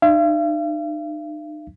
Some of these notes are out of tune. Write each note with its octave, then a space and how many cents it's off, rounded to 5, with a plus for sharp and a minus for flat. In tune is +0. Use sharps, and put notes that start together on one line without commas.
D#4 -45 F5 -45